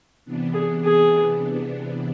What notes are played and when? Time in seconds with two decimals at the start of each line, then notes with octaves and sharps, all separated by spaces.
0.25 C3 E3 B3 D4
0.54 G#4
0.84 G#4